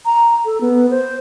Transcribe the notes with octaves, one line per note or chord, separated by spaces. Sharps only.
A#5
A4
B3
C5